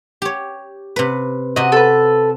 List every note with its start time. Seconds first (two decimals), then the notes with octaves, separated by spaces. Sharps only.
0.22 G4 C#5
0.96 C3 B4
1.56 C3 F#4 D#5
1.72 A4 B4